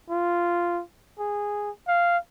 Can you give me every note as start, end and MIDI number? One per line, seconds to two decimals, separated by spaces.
0.10 0.83 65
1.19 1.70 68
1.88 2.18 77